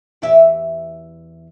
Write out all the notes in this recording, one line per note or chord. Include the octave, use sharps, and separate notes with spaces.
E2 G4 E5